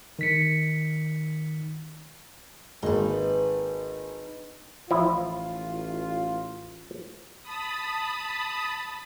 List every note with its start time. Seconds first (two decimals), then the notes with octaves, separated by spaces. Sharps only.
0.19 D#3 B6 C#7
2.82 G#1 G#3 A#3 D#4 B4
4.91 A1 F3 E4 F4 E5
7.42 A5 B5 D#6